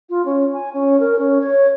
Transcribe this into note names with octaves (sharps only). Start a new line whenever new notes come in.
F4
C#4
G#5
C#4
A#4
C#4
C#5